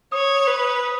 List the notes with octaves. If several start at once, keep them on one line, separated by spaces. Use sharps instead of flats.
C#5 D#6
B4
D#6